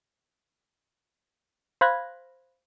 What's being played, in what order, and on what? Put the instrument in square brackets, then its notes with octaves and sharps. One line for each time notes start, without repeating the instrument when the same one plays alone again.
[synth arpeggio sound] C5 F5 B5 F#6 G#6 A#6